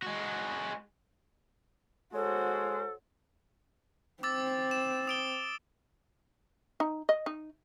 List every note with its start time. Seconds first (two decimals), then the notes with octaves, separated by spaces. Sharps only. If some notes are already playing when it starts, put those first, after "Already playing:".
0.02 G#3 F#4
2.14 G#3 F#4 A4 C5 C#5
4.23 C4 D6 E6 A6
4.71 E7
5.07 D#6 D7 G7
6.80 D#4
7.09 D#5
7.26 D#4